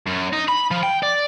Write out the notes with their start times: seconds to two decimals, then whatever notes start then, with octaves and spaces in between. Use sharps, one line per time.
0.07 F#2
0.33 D#4
0.48 B5
0.71 F3
0.83 G5
1.03 D5